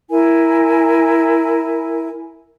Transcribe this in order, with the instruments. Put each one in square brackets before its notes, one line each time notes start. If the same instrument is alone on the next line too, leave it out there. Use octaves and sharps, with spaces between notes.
[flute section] E4 A#4 G#5